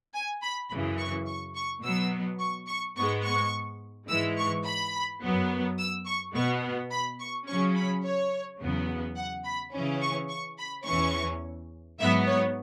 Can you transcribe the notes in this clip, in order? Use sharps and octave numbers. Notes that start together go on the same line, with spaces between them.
G#5
B5
F#2 C#3 E3 B5
C#6
C#6
C#6
B2 F#3 B3 E6
C#6
C#6
G#2 G#3 B3 C#6
C#6
G#2 E3 G#3 E6
C#6
B5
F#2 F#3 B3
E6
C#6
B2 B3 C#6
B5
C#6
C#3 F#3 C#4 C#6
B5
C#5
E2 C#3 F#3 B3
F#5
B5
C#3 E3 C#4
C#6
C#6
B5
E2 E3 C#4 C#6
G#2 F#3 B3 E5
C#5